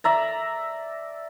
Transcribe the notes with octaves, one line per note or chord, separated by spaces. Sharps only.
D5 E5 A#5